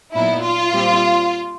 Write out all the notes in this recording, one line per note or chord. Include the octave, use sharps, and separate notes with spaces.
A#2 F#3 B3 D#4 E4
F4
A#2 G3 C4